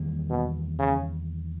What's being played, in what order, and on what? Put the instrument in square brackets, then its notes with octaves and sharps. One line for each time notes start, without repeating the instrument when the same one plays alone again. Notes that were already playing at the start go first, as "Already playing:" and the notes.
Already playing: [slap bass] E2 D#3 G3 A#3
[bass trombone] B2
C#3